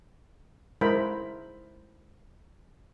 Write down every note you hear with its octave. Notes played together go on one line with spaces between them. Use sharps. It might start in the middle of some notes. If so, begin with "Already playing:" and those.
G#3 E4 A#4 C5 B5